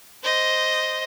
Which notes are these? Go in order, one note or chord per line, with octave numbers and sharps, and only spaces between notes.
C5 D#5